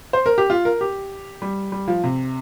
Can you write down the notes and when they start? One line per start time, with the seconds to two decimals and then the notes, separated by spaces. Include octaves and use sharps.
0.13 C5
0.26 A#4
0.38 G4
0.50 F4
0.65 A#4
0.81 G4
1.42 G3
1.72 G3
1.88 F3
2.04 C3